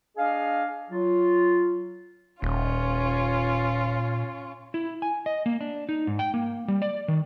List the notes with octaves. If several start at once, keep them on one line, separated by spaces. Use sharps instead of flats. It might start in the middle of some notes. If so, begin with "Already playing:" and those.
D4 G#4 D#5 F5
F#3 F4
D#1 A#2 C#4 F4
E4
G#5
D#5
A#3
D4
D#4
G#2
G5
A#3
G3
D5
D#3